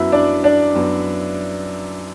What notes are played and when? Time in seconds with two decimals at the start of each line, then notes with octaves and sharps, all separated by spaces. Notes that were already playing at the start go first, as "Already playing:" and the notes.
Already playing: F#2 F#3 B3 E4 E5
0.12 D4 D5
0.44 D4 D5
0.75 F#2 F#3 B3